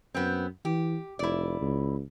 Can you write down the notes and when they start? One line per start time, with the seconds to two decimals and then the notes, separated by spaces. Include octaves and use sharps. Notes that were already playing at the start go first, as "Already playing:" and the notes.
0.15 F#2 B3 C4
0.65 E3 G4
1.19 F1 E4 D5
1.61 C#2